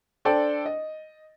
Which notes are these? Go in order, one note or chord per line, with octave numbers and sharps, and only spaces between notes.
D4 A4 C5 D5 G5
D#5